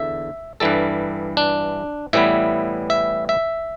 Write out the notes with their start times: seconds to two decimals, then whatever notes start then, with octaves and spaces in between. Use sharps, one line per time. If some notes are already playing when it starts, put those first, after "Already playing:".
Already playing: E2 D3 E5
0.60 G2 E3 G3 A4
1.37 D4
2.13 A2 E3 G3 B3 E5
2.90 E5
3.29 E5